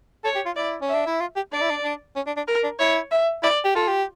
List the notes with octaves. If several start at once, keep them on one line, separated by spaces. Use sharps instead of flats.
A4 C#5
G4
F4
E4 D5
C#4
E5
D4
E4
F4
G4
D4 D5
E4
D4
D4
C#4
D4
D4
A#4
D4
E4 C#5
E5
E4 D5
G4
F4 A4
G4